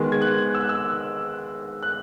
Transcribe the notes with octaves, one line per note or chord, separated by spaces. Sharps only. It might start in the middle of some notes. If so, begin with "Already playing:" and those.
Already playing: D#3 G#3 B3
G#6
F#6
E6
F#6
E6
F#6